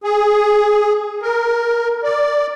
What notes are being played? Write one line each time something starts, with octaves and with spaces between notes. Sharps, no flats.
G#4
A#4
D5